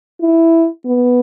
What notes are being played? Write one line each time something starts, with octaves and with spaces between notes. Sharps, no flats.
E4
B3